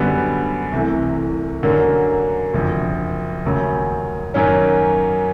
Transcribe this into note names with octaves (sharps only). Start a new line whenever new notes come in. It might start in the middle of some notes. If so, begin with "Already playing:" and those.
Already playing: F#2 D3 G3 B3
C2 C3 E3 A3
F#2 D3 F#3 A#3
F#1 F2 D3
F1 D#2 C#3 F#3
F#2 D#3 F#3 A#3 C#4